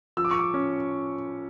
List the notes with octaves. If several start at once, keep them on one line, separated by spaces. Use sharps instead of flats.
F3 E6
D6
C#6
D6
C#4